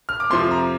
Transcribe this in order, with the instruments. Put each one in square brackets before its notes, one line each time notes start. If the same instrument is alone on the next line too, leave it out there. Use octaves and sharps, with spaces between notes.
[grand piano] F6
D6
F2 C3 F3 C6
A#5